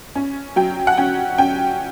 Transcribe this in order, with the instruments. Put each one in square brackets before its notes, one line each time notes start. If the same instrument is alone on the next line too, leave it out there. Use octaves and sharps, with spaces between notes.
[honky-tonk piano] C#4
F#3 G5
F#5
C#4 G5
C#4 G5